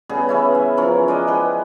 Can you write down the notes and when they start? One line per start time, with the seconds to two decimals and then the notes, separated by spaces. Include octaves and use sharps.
0.09 C#3 G3 B3 G#4
0.29 E3 C#4 E4
0.55 E5
0.77 E3 F3 C#4 A#4
1.08 G#3 D5 D#5
1.27 G#4 B4 G5